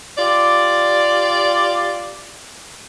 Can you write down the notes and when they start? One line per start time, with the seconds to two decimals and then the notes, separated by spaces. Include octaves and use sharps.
0.18 F4 G4 D5